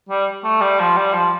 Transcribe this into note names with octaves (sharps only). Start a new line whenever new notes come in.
G3
A3
G3
F3
G3
F3